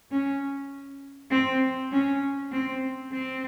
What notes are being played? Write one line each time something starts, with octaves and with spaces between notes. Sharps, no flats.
C#4
C4
C#4
C4
C4